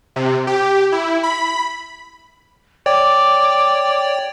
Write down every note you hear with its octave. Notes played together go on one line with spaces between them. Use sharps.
C3
G4
E4
B5
C#5 D5 G5 D6